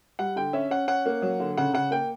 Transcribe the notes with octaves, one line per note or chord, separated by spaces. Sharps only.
G3 F#5
D3 G5
C#4 E5
C#4 F#5
C#4 F#5
A#3
F#3
D3
C#3 F#5
C#3 F#5
A#3 G5